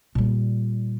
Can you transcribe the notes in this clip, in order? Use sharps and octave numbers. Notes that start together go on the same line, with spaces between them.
A#2 G3